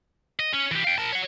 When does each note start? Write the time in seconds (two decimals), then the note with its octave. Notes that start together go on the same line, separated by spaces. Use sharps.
0.39 D#5
0.53 C#4
0.72 E3 G4
0.84 F5 G5
0.98 A#4 A5
1.12 C#5 F#5